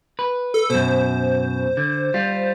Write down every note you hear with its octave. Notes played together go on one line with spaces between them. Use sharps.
B4
A4
F#2 B2 C5
D3
G3 F4